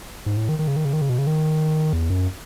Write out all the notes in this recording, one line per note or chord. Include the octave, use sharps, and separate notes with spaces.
G#2
A2
D#3
D#3
C#3
D#3
C#3
D#3
C#3
B2
C#3
D#3
E2
F#2